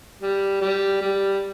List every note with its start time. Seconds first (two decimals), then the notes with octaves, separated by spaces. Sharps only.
0.22 G3
0.61 G3
1.01 G3